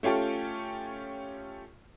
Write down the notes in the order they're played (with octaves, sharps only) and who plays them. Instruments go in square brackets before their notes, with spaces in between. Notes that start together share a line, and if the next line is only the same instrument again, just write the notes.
[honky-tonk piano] A3 C#4 F4 G4 A4